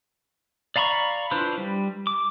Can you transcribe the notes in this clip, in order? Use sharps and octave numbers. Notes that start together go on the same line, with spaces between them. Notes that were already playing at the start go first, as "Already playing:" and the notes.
D5 F5 A#5 B5 C#6
D4 E4 F4 B4 C5
G3
D6